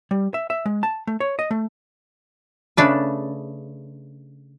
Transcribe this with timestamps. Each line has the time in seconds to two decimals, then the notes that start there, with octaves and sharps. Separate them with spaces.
0.11 G3
0.34 E5
0.50 E5
0.66 G#3
0.83 A5
1.07 A3
1.20 C#5
1.39 D#5
1.51 A3
2.77 C#3 A3 D4 B4